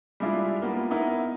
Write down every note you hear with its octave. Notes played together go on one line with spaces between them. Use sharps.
G3 G#3 D4 E4 F4
A#3 B3 F4
B3 D#4 E4 A#4